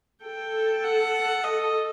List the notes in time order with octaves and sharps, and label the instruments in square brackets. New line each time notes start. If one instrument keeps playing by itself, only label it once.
[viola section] A4 [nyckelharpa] G5
[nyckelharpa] F#5
D#5